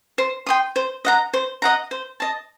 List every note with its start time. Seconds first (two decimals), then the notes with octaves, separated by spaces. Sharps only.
0.18 C5
0.47 G5 C6 D#6
0.76 C5
1.05 D#5 F#5 A#5
1.34 C5
1.62 D#5 F#5 A#5
1.91 C5
2.20 D#5 A5